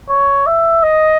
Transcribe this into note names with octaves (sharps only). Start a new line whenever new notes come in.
C#5
E5
D#5